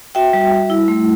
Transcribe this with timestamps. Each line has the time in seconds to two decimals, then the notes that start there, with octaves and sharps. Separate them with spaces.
0.15 F#4 E5 G5
0.33 G3
0.52 G3
0.70 E4
0.88 A3